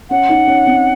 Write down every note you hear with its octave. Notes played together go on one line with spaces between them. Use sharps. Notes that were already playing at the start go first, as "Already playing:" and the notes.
C#4 F#5
D#4
C#4
C4